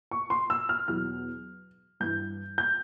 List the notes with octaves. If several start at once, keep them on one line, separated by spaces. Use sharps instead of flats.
C#6
C6
E6
F6
E2 B2 F#3 F6
G2 E3 G6
G6